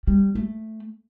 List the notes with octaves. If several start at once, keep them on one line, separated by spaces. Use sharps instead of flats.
G3
A3